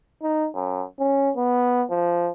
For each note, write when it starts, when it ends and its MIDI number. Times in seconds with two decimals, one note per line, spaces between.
0.22 0.48 63
0.55 0.83 42
0.99 1.31 61
1.37 1.84 59
1.90 2.31 53